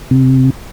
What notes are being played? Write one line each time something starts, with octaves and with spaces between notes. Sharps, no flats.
C3